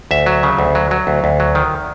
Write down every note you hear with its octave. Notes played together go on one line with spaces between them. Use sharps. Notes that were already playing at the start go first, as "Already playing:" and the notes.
D2 E5
F#3
C#3
D2
F#3
F#3
D2
D2
F#3
D#3